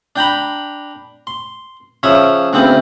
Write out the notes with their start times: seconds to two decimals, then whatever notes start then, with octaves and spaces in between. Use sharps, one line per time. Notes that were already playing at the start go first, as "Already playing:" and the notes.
0.16 D4 G5 A#5 B5
1.27 C6
2.03 C#3 F3 C#5 E5 D#6
2.53 D2 C#3 E3 B3 C4